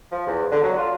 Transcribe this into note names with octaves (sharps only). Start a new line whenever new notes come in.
F3
E2
D3
F#3
F4